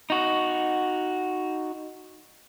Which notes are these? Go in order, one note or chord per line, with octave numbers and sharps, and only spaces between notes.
D#4 F#4